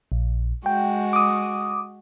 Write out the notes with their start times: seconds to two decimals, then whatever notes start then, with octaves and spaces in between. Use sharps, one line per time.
0.12 A#1
0.66 G#3 F#4 G5
1.13 D6 D#6